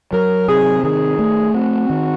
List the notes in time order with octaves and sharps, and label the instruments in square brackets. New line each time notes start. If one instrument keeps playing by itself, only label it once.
[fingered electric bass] F#3 [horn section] A#4
[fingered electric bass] C3 [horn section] G#4
[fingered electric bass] D#3 [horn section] G#4
[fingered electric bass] A3
[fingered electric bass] C4 [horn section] F#4
[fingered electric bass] D#3